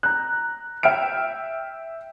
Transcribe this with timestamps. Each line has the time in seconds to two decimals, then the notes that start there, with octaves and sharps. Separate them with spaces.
0.03 A#5 F#6
0.83 E5 G5 F6 D7